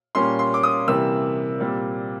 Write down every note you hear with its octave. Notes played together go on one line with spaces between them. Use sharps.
A#2 G3 A#3 C#4 C6
C6
D6
D#6
C3 E3 G3 A#3 E6
A#2 G3 C4